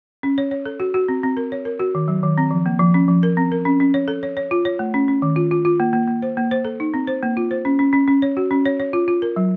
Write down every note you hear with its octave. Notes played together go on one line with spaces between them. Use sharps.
C#4
C#5
C#5
A4
F#4
F#4
C4
C4
A#4
C#5
A#4
F#4
D#3
F#3
D#3
C4
F3
A#3
F3
C#4
F3
A#4
C4
A#4
C#4
C#4
C#5
A4
C#5
C#5
F4
C#5
A3
C#4
C#4
D#3
F4
F4
F4
A#3
A#3
A#3
C5
A#3
C5
A4
D#4
C4
C5
A#3
F4
C5
C#4
C#4
C#4
C#4
C#5
F#4
C#4
C#5
C#5
F4
F4
A#4
F#3